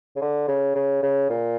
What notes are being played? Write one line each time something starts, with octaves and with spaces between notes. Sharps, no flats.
C#3
D3
C#3
C#3
C#3
A#2